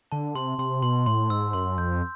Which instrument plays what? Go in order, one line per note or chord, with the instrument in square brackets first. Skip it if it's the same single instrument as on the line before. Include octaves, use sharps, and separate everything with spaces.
[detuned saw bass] D3 [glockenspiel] A5
[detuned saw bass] C3 [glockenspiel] C6
[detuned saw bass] C3 [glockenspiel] C6
[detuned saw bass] B2 [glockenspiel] C6
[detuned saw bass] A2 [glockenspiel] C6
[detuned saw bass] G#2 [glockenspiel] E6
[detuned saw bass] F#2 [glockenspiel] C6
[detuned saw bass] F2 [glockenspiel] G6